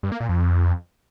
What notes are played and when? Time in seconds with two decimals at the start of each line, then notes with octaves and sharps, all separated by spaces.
0.03 G2
0.12 A#3
0.20 A#2
0.29 F2